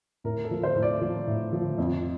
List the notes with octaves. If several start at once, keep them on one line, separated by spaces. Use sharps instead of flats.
A2 A#4
A4
F3
C5
A2
D5
F3
A2
F3
F2